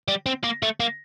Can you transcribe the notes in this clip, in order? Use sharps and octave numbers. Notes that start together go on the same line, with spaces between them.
G3
C4
A#3
A3
A#3